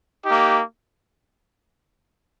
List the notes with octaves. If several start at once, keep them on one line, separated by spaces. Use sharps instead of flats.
A#3 D#4 G4